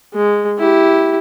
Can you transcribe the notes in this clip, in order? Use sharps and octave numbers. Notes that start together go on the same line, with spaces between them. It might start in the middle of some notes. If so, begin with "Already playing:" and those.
G#3
E4 G4